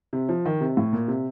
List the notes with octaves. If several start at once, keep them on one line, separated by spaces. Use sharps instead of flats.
C3
F3
D#3
C3
A2
A#2
C3